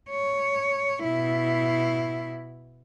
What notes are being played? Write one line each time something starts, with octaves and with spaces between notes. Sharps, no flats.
C#5
B2 E4